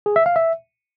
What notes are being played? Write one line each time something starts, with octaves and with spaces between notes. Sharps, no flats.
G#4
E5
F5
E5